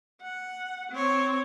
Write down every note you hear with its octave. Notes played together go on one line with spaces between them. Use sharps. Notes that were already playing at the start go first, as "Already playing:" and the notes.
F#5
C4 C#5